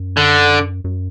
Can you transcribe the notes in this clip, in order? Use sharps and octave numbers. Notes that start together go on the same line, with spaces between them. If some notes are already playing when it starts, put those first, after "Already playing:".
Already playing: F#2
D3
F#2